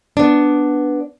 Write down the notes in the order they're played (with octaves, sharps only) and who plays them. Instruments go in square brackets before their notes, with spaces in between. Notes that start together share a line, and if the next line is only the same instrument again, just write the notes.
[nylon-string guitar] B3 D4